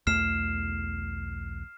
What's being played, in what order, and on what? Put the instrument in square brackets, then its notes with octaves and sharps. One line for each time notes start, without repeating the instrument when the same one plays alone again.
[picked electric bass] B1 E2 A3 [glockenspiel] F6 C7 E7